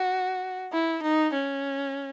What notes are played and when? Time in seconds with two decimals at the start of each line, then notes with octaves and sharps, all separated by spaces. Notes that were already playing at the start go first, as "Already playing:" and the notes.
Already playing: F#4
0.73 E4
1.03 D#4
1.33 C#4